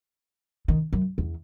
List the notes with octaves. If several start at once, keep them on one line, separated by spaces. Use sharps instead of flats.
D#3
F#2
E2